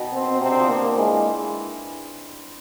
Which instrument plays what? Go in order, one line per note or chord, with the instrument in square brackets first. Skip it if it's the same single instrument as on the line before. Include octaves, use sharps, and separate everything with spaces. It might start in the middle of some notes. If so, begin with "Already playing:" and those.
Already playing: [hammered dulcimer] B2 D#3
[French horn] C4
[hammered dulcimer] C3 [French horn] C4
[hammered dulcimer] D3
F3
[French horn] A#3
[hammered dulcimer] E3 [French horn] G#3